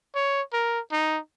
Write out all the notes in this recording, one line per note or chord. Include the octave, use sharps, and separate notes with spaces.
C#5
A#4
D#4